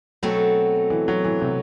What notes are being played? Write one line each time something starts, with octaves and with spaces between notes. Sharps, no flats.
B2 F#3 A3 C4 F#4 A4
E3
F#3
E3
C3